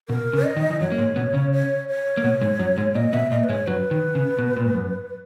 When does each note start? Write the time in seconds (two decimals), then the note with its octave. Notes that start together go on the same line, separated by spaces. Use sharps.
0.09 B2 A#4
0.33 C#3
0.45 D#5
0.57 D#3
0.70 E3
0.80 F#2 F#3 C#5
0.92 A#3
0.98 G#2 G#3
1.16 B2 B3
1.33 C#3 C#4
1.52 C#5
1.88 C#5
2.17 A#3
2.24 B2 B3
2.41 G#2 G#3
2.59 F#2 F#3
2.77 G#2 G#3
2.95 A#2 A#3 D#5
3.13 B2 B3 E5
3.31 A#2 A#3 D#5
3.44 B4
3.49 G#2 G#3 C#5
3.67 F#2 F#3 B4
3.91 D#3
4.15 C#3
4.39 B2
4.57 A#2
4.66 G#2
4.75 F#2